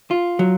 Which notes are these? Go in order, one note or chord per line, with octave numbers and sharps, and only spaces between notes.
F4
F#3